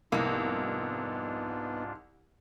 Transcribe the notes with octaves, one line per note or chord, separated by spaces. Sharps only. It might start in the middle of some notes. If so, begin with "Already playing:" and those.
C2 F2 G#2 A#3 B3 D4 D#4 F4